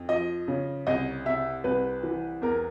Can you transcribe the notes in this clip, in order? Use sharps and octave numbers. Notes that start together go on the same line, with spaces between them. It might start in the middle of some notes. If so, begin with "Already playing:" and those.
Already playing: F2
F3 D#5
C#3
C2 D#5
C3 E5
C2 B4
E3
E2 A#4